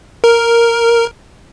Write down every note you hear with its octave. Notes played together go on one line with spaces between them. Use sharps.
A#4